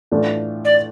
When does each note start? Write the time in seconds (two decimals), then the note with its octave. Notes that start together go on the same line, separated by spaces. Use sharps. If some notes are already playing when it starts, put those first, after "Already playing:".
0.11 A2 E3 A3 D4 F4
0.65 D5